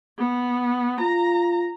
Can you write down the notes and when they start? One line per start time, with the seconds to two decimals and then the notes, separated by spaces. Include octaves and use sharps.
0.18 B3
1.01 F4 A#5